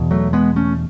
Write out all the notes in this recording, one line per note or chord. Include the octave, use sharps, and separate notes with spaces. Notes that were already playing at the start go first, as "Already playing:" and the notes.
Already playing: E2 B2
F#3 A3
G#3 B3
A3 C#4